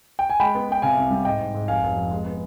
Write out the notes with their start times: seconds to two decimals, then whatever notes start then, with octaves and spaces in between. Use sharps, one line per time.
0.19 G5
0.30 G#5
0.40 G#3 G5 B5
0.55 B3
0.69 B3 G5
0.82 C3 F5 G#5
0.96 C2
1.11 G3
1.25 G#2 D#5 G5
1.40 G#2
1.54 G#2
1.68 F1 F5 G#5
1.83 F1
1.96 F2
2.11 G#3
2.25 B3